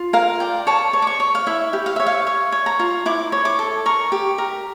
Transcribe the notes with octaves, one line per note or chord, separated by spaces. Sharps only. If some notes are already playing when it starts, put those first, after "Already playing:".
Already playing: F4
A#4 F5
D5 G5
C#5 A5
C#5
D6
C#6
C#5
F5
E4 E5
G4
F5
C#5 E5
F5
C#5
C#5
A#5
F4
E4 D6
C#5
D6
A4
A#4 C#6
G4
A#4